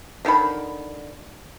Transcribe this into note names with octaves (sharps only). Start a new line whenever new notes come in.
D3 D#3 G#4 B5